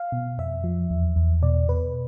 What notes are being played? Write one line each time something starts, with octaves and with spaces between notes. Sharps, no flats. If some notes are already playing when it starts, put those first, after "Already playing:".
Already playing: F5
B2
F2 E5
F3
E2
E2
B2 D5
B2 B4